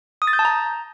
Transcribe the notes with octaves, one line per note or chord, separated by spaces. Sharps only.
D#6
A6
G6
A5
A#5